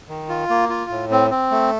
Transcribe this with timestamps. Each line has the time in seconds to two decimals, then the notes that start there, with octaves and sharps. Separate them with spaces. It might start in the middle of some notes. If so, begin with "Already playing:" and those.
0.09 D#3
0.29 F4
0.50 A#3
0.69 F4
0.91 A2
1.11 C4
1.31 C4
1.51 A3